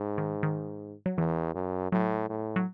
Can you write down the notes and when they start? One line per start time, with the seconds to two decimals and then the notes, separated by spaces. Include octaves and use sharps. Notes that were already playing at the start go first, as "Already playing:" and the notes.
Already playing: G#2
0.18 D#3
0.43 D#3
1.06 F#3
1.17 E2 E3
1.54 F#2
1.92 A2 F#3
2.29 A2
2.56 F#3